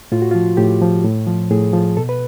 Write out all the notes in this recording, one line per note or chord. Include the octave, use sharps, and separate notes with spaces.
A2 F4
F#4
F4
F3
A2 G4
F3
A2
F3
A2 G#4
F3
B2 A4
B4